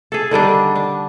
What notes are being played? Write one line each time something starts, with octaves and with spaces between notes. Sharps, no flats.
G#4 A4
D3 D#3 G3 D4
D4